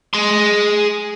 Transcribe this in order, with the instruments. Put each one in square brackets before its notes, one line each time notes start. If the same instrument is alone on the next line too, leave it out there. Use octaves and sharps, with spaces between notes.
[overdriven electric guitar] G#4 C6